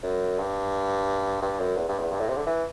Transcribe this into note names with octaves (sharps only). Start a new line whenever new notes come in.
F#2
G2
G2
F#2
E2
G2
E2
G2
A2
C3
D3
E3